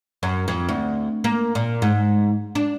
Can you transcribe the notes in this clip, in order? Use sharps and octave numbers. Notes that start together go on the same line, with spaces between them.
F#2
F2
D2
A#3
A#2
G#2
D4